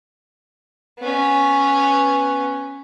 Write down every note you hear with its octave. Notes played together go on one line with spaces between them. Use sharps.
B3 C#4